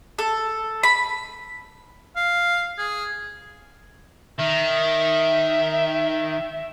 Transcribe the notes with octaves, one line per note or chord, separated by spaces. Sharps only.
A4
B5
F5
G#4
D#3 E5